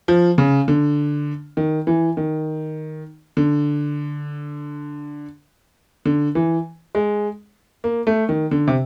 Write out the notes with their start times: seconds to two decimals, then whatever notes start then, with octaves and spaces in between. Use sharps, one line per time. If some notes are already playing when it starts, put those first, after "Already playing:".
0.08 F3
0.38 C#3
0.68 D3
1.57 D#3
1.87 E3
2.17 D#3
3.37 D3
6.05 D3
6.35 E3
6.95 G#3
7.84 A#3
8.07 A3
8.29 D#3
8.51 D3
8.68 C3